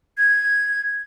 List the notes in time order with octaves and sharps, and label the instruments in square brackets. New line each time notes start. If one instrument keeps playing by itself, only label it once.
[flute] G#6